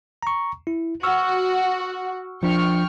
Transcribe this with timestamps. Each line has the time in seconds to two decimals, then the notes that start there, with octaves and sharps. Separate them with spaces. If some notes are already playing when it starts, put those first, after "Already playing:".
0.23 A#5 C#6
0.67 E4
1.03 F#4 C#6 E6 F6
2.43 F3 D4 G5 C#6 F6